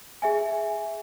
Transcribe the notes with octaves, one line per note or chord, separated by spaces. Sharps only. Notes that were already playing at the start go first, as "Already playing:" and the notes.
G#4 E5 G#5